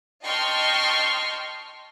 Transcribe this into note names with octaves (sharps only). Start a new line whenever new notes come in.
D#5 G5 A5 C6 C#6 F6